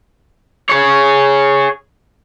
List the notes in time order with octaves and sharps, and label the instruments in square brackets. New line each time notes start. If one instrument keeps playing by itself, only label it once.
[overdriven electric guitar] G#4 C#5